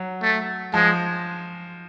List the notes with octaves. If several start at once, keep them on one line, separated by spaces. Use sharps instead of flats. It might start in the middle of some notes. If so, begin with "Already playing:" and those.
Already playing: F#3
A3
F3 G#3